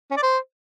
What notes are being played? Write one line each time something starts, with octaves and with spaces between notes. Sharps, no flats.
C#4
D5
C5